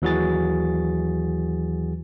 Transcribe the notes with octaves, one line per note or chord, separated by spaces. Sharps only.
D#2 E3 F#3 F#4 G#4 A6